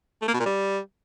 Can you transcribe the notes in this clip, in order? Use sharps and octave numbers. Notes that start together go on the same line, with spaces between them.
A3
A#3
B2
A#2
G3